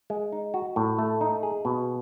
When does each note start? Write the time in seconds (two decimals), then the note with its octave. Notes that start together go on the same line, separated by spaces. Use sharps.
0.10 G#3
0.32 D#4
0.54 F#4
0.76 A2
0.98 A3
1.21 D#4
1.43 G#4
1.65 B2